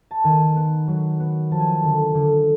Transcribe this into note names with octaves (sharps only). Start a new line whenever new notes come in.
A5
D#3 G#5
B3
F#3
B3
F3 A5
G#5
A5
D3
D3